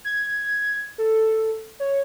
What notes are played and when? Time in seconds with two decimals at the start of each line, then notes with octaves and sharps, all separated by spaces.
0.05 G#6
0.98 A4
1.80 C#5